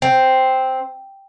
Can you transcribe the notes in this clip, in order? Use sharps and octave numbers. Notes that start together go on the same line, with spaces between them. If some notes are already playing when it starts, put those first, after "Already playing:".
C4